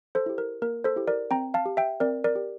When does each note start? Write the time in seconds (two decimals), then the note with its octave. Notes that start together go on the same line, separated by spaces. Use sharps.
0.15 A4 C5
0.26 E4 G4
0.38 A#4
0.62 A#3 A#4
0.84 A4 C5
0.96 E4 G4
1.08 A#4 D5
1.31 C4 G5 A#5
1.54 F5 A5
1.66 G4
1.77 E5 G5
2.00 C4 A#4 D5
2.24 A#4 D5
2.36 G4